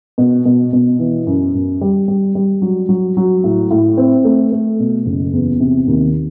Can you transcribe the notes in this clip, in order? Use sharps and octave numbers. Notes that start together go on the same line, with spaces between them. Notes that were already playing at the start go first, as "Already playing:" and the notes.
B2
B2
B2
E3
F#2
F#2
G3
G3
G3
F#3
F#3
F#3
A2
A2
C4
A3
A3
B2
F#1
E2
C3
D#2